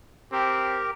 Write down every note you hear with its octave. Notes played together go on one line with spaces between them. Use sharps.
C4 G4 A#4